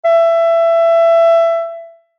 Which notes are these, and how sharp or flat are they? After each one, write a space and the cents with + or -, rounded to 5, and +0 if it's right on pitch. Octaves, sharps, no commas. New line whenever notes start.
E5 +20